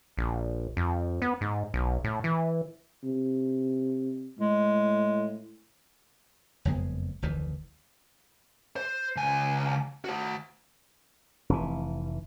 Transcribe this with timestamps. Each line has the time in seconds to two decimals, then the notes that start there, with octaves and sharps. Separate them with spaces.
0.17 A#1
0.77 F2
1.22 B3
1.41 G#2
1.74 B1
2.04 A2
2.24 E3
3.04 C3
4.39 A2 G#3
6.65 F#1 F2 G#3 B3
7.22 F1 D2 D#3 E3
8.76 C5
9.16 C#2 G#5
10.05 F#4 C5
11.49 F1 E3